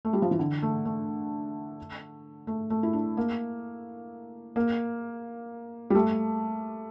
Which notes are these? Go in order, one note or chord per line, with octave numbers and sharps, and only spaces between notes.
A3
G3
F3
E3
D3
A3
A3
A3
A3
E4
D4
A#3
A#3
G3
A3